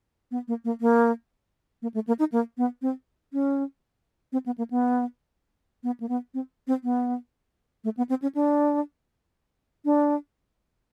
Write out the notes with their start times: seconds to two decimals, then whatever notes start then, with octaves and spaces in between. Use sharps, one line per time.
0.31 B3
0.48 A#3
0.65 A#3
0.81 A#3
1.82 A#3
1.94 A3
2.07 A#3
2.19 D#4
2.32 A#3
2.58 B3
2.82 C4
3.33 C#4
4.32 C4
4.46 B3
4.58 A#3
4.71 B3
5.84 B3
6.00 A#3
6.09 B3
6.34 C4
6.67 C4
6.84 B3
7.84 A3
7.97 B3
8.09 C4
8.22 C#4
8.35 D4
9.85 D4